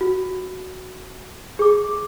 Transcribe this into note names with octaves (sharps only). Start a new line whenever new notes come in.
F#4
G#4 D6